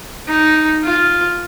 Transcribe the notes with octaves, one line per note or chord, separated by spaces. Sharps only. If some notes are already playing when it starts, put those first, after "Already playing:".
D#4
F4